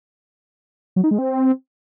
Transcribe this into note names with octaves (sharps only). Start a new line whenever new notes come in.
F#3
D#4
G#3
C4